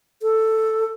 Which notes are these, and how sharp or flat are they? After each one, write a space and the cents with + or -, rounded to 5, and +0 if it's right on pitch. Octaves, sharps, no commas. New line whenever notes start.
A4 +5